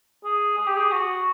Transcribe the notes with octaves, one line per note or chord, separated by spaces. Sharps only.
G#4
G#4
G4
G#4
F#4